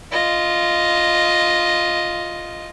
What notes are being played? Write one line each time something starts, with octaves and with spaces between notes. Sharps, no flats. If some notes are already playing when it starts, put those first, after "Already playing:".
F4 D#5